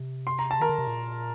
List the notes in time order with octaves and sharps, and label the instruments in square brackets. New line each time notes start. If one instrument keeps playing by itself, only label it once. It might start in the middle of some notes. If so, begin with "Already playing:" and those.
Already playing: [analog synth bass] C3
[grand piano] C6
A#5
A5
[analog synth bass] D#3 [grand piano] A#4 A#5
[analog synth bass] D3
C3
A#2